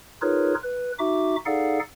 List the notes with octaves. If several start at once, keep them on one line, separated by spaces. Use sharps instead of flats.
D#4 F4 G#4 A#4 B4 C#5
B4
D#4 F#4 E5 D6
D#4 G#4 A4 D5 F5 F#5